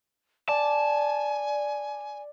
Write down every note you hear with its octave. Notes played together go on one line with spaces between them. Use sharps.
D5 G#5 A5